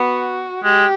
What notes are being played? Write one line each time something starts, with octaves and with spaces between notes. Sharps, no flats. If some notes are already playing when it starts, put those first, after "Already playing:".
Already playing: B3 F#4
G#3 G4